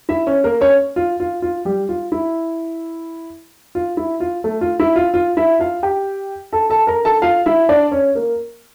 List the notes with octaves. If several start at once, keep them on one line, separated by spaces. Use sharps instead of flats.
E4 E5
C#4 C#5
A#3 A#4
C#4 C#5
F4
F4
F4
G3 G4
F4
E4
F4
E4
F4
A3 A4
F4
E4
F4
F4
E4 E5
F4 F5
G4 G5
A4 A5
A4 A5
A#4 A#5
A4 A5
F4 F5
E4 E5
D4 D5
C#4 C#5
A#3 A#4